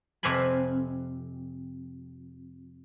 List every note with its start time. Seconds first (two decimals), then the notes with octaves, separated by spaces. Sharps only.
0.23 F2 C3 F5 G#5 B5